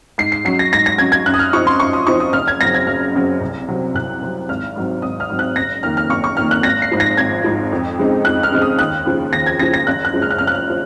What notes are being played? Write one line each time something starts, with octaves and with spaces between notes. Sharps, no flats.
G#2 C7
C7
F#3 C#4 C7
A#6
G#2 A#6
A#6
F#3 C#4 G#6
G#6
F#2 F#6
D#6
F6
F3 C4 D#4 C#6
C6
F#2 C#6
D#6
F3 C4 D#4 C#6
D#6
F#1 F6
G#6
F#2 C#3 F#3 C4 A#6
G#6
F#1 F6
F#2 C#3 F#3 C4
C2
C3 F#3 C4
C2 F#6
C3 F#3 C4
G#1 F6
G#2 F#3 C4
G#1 D#6
F6
G#2 F#3 C4
F#6
F#1 A#6
F2 D#3 A#3 F6
F6
F#1 C#6
C#6
F2 D#3 A#3 F6
F#6
G#1 A#6
C7
G#2 F3
A#6
G#1 G#6
G#2 F3
F2
C#3 G#3 C4 D#4
F2 F#6
F6
C#3 G#3 C4 D#4
D#6
D#2 F#6
C#3 F3
D#2 A#6
G#6
C#3 F3 A#6
A#6
F#1 F#6
F#6
F#2 F3 G#3
F6
F#6
F#1 F6
F#6
F6
F3